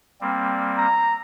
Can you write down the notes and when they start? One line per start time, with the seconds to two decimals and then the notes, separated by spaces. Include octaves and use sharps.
0.21 G3 A#3 C4
0.78 A#5